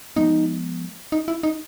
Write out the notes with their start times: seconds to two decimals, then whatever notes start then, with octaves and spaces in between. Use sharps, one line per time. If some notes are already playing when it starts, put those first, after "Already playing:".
0.16 F3 G#3 B3 D#4
1.12 D#4
1.28 E4
1.43 D#4